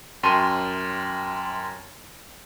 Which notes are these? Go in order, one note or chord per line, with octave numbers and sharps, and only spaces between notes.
F#2 G5 A5 C6 C#6 D#7